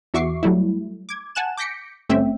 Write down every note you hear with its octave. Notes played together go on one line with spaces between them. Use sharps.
E2 F#4 E5 C#6 D6 C7
F#3 G3 A3 E4
D6 G#6
F#5 G#5 A5 F#6 E7
D6 G6 A#6 B6 C#7 D7
G1 A3 C4 C#4 E5 G5